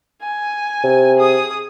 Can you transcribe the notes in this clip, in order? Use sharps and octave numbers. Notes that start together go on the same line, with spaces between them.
G#5
C3
G#4 D#6